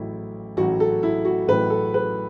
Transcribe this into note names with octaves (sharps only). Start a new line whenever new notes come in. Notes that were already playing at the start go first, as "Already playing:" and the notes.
Already playing: A1 A2 F#3 E4
A1 A2 F#3 F#4
A4
E4
F#4
A1 A2 F#3 B4
A4
B4